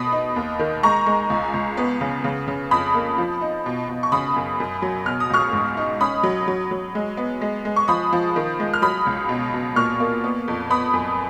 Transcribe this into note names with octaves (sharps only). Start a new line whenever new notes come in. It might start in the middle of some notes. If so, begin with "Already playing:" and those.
Already playing: B2 B3 B5 D#6
D#4
D#2
D#3
G#3 A#5 C#6
G#3
C#2
C#2
B3
C#3
C#3
C#3
F2 B5 D#6
A#3
F3
D#4
B2
B2
C#6
C#3 B5 D#6
F#2
F#2
F#3
B2 F6
D#6
C#2 C#6 F6
G#2
D#4
C#4 B5 D#6
F#3
F#3
F#3
G#3
B3
G#3
G#3
C#6
F3 B5 D#6
F3
D#3
G#3
F6
F#3 B5 D#6
C#2
B2
B2
A#2 C#6 F6
A#3
B3
F2
B3 B5 D#6
F#2